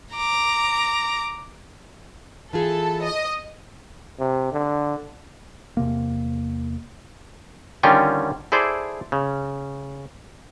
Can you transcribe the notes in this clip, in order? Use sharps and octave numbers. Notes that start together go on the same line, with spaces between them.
A#5 D6
E3 F4 G#4 A4
D#5
C3
D3
E2 C3 A#3
D3 D#3 G3 C#4 F4 G5
E4 G#4 A4 C5 D5
C#3